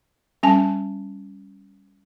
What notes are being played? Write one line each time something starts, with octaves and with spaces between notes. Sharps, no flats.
G3 C#4 G#5 A5